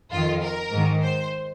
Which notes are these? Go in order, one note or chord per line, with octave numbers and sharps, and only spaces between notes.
F2 D#3 F4
A#4
G#2 D#3
C5